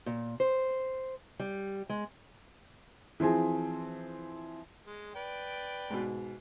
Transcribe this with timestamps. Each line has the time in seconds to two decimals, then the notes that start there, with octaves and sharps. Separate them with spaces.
0.06 A#2
0.40 C5
1.39 G3
1.89 G#3
3.20 E3 F3 C4 G#4
4.86 G#3
5.15 B4 D5 G5
5.90 G#2 B2